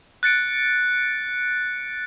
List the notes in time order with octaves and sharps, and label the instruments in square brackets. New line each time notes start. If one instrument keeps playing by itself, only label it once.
[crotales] F#6 A6 C#7 D7